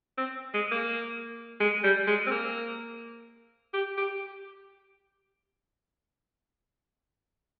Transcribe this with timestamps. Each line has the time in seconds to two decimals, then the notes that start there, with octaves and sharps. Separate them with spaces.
0.17 C4
0.54 G#3
0.71 A#3
1.60 G#3
1.83 G3
2.07 G#3
2.27 C4
2.31 A#3
3.74 G4
3.97 G4